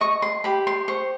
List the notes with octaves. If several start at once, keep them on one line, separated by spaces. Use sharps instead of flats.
D#5 C#6
C6
G4 B5
C6
C5 C#6